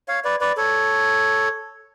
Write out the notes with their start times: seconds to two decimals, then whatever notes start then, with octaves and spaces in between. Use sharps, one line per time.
0.08 C#5 F5
0.24 B4 D5
0.41 B4 D5
0.57 A4 C#5